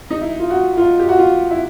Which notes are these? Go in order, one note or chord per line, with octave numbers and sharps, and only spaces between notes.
D#4
E4
F4
F#4
F4
G4
F#4
F4
E4